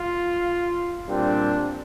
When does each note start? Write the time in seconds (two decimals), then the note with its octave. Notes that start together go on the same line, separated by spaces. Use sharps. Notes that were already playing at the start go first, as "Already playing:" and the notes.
Already playing: F4
1.06 A#2 G3 C4 D4